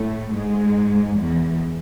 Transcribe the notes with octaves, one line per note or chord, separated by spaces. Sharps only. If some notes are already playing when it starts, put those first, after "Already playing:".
Already playing: A2 A3
G#2 G#3
E2 E3